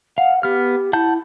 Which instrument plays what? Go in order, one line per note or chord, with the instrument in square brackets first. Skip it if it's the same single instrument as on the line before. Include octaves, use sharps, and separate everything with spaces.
[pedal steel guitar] F5 [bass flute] F#5
[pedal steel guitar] B3 F6 [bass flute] G4
[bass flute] E4 [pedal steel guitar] F#5 A5 G6